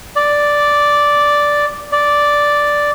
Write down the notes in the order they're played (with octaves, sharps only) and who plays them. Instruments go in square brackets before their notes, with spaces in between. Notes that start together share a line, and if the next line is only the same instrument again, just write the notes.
[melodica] D5
D5